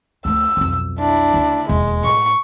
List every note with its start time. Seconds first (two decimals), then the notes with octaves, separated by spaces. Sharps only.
0.25 D2 A3 E6
0.57 B1 F2
1.00 D4 E4
1.34 D2 C#3
1.69 E1 D#2 G#3
2.04 A2 C#6